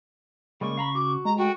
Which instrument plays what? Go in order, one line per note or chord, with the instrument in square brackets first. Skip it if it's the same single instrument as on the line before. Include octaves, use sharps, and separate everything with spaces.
[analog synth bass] C#3 [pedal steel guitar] G3 G#3 A#3 [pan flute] C#6
[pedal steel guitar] F5 A#5 B5
[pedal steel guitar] F#4 [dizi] D6
[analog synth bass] G#3 [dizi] A#5
[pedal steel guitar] A3 [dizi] F#4 [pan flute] G5